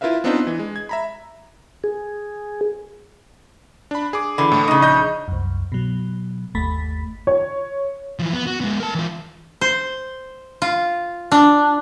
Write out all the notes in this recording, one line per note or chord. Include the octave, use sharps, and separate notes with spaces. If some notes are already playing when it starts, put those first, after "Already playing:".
E4 F4 A#4 B4 E5 F5
B3 C4 D4 D#4 F4 B4
E3
G#3
G#6
E5 A#5 B5
G#4
D4 B5
G#4 D6
D3 E3
A2 A3
C#3 D#4 D#6
A#1 D#5 G6
C2 F#2
B2 F#3
G1 D#2 A3 B5 A6 B6
C#5
E3 F3
B3
F#4
G#3 B3
A#4 A5
E3 F4
C5
F4
D4